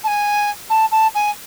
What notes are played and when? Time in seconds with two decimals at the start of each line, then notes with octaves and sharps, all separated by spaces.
0.04 A5
0.07 G#5
0.70 A5
0.91 A5
1.15 G#5